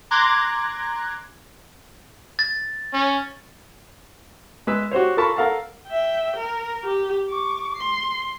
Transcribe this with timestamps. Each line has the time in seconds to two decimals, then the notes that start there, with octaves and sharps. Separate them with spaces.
0.11 A#5 C6 D6 F#6 G#6 A#6
2.39 A6
2.93 C#4
4.67 G#3 B4 E6
4.91 F#4 G4 C5 C#5
5.17 F4 A4 A#4 A5 B5 C#6
5.36 A4 A#4 F5 F#5 A5
5.87 E5 G5
6.37 A#4
6.85 G4
7.30 C#6 D6
7.76 C6